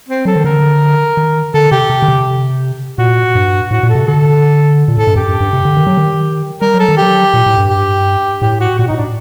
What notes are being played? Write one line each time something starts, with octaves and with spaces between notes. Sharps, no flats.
C4
F#3 A4
D#3
D3 A#4
D#3
D3 A4
C3 G4
C3
D3
C3
A#2 F#4
G2
A2 F#4
A#2
A4
C3
D3 A4
A#2
A2 A4
G2
F#2 G4
F#2
G2
C3
D3
D#3
F#3
D#3
G3 A#4
F#3
A4
D#3
G4
F#3
A#2
A2
G2
G4
A2 G4
F#4
A#2 F#4
A2 D#4
D4